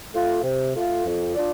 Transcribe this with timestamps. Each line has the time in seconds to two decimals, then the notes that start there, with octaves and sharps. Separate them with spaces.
0.13 A3 F4
0.43 C3
0.75 A3 F4
1.06 F2
1.35 D4 F4 D5